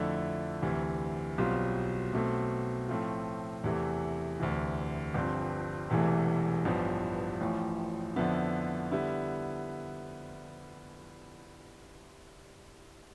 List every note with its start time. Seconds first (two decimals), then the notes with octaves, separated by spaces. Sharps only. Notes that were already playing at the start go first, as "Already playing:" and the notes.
Already playing: F2 D3 A3 E4
0.62 D2 C3 E3
1.38 B1 B2 G3 C4 F4
2.13 B1 B2 A3 C4
2.88 A2 F3 A3 C4 F4
3.64 E2 C3 E3 A3
4.40 D2 C3 E3
5.14 G1 G2 F3 C4
5.90 E1 E2 C3 E3 A3
6.65 A1 G2 F3 B3
7.41 A1 A2 F3
8.16 F2 D3 F3 B3 E4
8.92 D3 G3 B3 E4